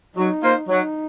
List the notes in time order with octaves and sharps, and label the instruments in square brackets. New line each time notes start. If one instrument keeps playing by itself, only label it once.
[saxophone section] F#3 [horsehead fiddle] D#4
[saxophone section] A#3 F4 C5
[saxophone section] F#3 [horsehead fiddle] D#4